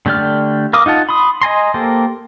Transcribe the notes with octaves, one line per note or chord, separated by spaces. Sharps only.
D3 A3 G4 D5 F6
A#4 F5 D6 D#6
D#4 F4 F#5 A5
B5 C6 D#6
D#5 G#5 A#5 C6
A#3 G4 A4 A#4 C5